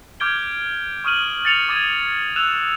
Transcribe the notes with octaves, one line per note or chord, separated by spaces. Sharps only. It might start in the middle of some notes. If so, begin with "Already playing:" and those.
D6 F6 G6 G#6 D7 G7
C#6 D#6 F6 D#7 F#7
A6 C#7 F7
D6 D#6 G#6 D#7
E6 F#6 E7 F7